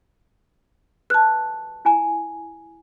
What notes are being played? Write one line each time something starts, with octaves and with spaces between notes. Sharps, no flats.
B4 A5 F#6
E4 G#5 A#5